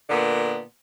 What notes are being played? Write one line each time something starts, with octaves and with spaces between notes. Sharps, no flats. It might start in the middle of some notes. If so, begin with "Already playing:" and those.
A#2 D3 B3